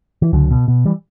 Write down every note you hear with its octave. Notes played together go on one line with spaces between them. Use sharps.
E3
C#2 D3 F#3
B2
B2
E3 G3